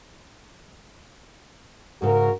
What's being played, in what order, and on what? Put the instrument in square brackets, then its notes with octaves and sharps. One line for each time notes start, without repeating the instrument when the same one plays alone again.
[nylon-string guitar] G#2 C#3 [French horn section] F#4 A#4